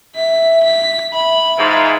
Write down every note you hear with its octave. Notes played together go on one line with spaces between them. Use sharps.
E5 B6
B6
E5 B5
G#2 E3 F4